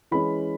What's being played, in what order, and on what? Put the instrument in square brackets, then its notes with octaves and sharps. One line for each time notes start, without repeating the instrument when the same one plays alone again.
[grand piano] E3 G#3 C#4 B5